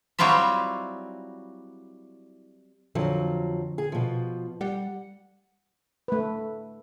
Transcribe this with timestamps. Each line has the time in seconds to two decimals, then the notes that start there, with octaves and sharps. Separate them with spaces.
0.18 F#3 G3 C4 E4 F4 E5
2.95 F2 D3 F3 F#3
3.78 G#4
3.92 B2 F3
4.61 G3 F#5
6.08 A3 B4